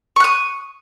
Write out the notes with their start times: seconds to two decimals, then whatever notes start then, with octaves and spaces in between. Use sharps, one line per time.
0.16 C#6
0.20 F#6
0.24 D#6